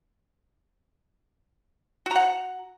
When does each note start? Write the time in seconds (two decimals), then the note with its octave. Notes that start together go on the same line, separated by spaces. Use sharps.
2.06 F#4
2.11 A#5
2.16 F#5